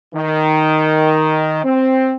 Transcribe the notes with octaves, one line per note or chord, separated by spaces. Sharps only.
D#3
C4